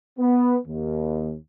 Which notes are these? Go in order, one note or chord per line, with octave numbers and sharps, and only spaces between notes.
B3
D#2